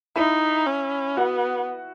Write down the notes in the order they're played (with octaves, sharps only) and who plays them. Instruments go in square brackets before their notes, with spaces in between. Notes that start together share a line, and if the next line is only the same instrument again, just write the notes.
[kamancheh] D#4 [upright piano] E4 E5
[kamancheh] C#4
[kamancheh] B3 [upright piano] F#4 F#5